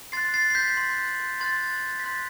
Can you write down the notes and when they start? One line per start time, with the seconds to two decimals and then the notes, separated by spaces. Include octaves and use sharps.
0.12 C6 A6 C7
0.17 F#6
0.34 A6 C7
0.50 C7
0.55 G6 B6
0.77 C6 F#6
1.40 C6 F#6 A6
2.00 B6
2.04 C6 F#6 A6